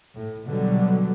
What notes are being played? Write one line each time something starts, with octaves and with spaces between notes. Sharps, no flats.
A2
B2 D3 F#3 G3